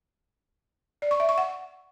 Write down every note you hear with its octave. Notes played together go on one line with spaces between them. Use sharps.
D5
C#6
E5
C#6
F#5